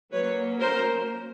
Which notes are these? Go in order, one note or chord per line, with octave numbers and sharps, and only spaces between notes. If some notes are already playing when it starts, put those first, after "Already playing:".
F#3 A#3 C#4 B4 C#5
A#4 C5